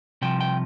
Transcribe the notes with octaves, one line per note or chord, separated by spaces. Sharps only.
C2 C3 F3 G5
G5